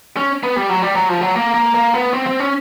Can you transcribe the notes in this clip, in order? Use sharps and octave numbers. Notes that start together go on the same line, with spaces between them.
C#4
B3
G3
F#3
G3
F#3
F3
F#3
A#3
A#3
A#3
B3
C4
C4
C#4